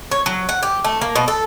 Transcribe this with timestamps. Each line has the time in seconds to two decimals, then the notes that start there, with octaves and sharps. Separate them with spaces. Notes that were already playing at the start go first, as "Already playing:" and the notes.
0.11 C#5
0.26 F#3
0.49 F#5
0.63 G4
0.84 A3
1.01 A#3
1.15 B2
1.28 A4